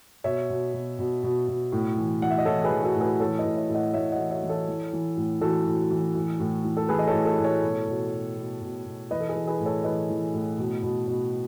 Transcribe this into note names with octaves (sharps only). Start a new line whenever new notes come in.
B2 C#5 E5
B2
B2
B2
B2
B2
A2
E3
E3 F#5
E5
D#5
E3 A4 C#5
G#4 B4
E3
F#4 A4
A2
G#4 B4
E3 A4 C#5
B4 D#5
A2
C#5 E5
A2
D#5 F#5
A2 C#5 E5
D#5 F#5
E3
C#5 E5
E3
A4 C#5
E3
E3
A2
E3 F#4 A4
A2
E3
E3
A2
E3
A4
E3 G#4 B4
D#5
A4 C#5
A2
A4 C#5
A2
A4 C#5
B2
B2
B2
B2
B2
B2
E3 B4 D#5
A4
G#4 B4
E3
G#4 B4
A2
A4 C#5
E3 B4 D#5
E3
A2
B2
B2
B2